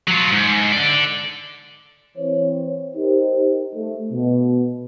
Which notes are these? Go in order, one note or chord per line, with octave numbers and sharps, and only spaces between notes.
F#3 F4
G#2
D3 D5
E3 C4 C5 C#5
D#4 G4 A#4 C5
A3
B2